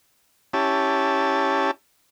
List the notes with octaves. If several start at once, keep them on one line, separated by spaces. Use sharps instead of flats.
C#4 E4 G4 A5